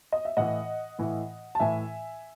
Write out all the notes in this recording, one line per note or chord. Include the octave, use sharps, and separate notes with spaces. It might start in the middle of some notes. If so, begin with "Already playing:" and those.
D#5
E5
A2 E3 D#5 F#5
A2 E3
A5
A2 E3 E5 G#5